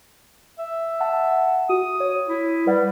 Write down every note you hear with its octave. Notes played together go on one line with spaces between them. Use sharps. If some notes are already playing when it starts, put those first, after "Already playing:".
E5
F#5 A5
F#4 D#6
C#5
E4
G3 B4 D5 F#5